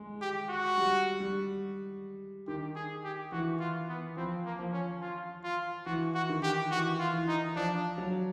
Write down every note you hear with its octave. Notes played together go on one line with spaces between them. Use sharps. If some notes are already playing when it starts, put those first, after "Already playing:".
Already playing: G#3
G4
F#4
G3
G3
D#3 G4
G#4
G4
E3 F#4
F4
B3
F3 C4
A#3
F3
C#4
F4
F4
E3 F#4
F#4
D#3
G4
E3 F#4
F4
E3
D#4
F3 D4
F#3